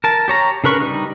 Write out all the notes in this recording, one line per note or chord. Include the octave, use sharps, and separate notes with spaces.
A#4 A5
G4 C#5 A#5
C#3 D4 A#4 B4 C#6
G3 D#4